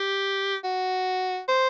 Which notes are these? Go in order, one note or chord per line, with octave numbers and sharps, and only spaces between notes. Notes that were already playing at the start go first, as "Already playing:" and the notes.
Already playing: G4
F#4
C5